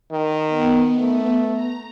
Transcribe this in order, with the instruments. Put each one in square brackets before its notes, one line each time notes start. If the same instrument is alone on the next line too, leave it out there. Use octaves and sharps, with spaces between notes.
[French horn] D#3
[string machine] B3
[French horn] A3
[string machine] A#5